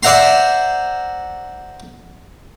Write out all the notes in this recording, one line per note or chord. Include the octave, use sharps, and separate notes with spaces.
C5 D5 E5 F#5 A#5 C6